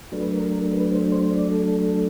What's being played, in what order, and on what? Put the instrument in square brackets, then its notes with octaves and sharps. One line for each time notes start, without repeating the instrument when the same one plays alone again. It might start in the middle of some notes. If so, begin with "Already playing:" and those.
[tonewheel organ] F#3 A3 D4 B4
A#4
A#4
B4
C5
C5
D5
A4